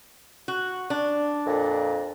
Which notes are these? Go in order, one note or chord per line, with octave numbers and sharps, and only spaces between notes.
F#4
D4
F2 A#2